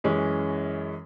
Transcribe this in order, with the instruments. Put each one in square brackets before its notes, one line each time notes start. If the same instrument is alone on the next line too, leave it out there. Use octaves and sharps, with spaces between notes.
[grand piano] F#2 E3 G#3 C#4